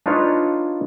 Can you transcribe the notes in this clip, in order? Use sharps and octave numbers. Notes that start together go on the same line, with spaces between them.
D4 D#4 F4 B4 C#5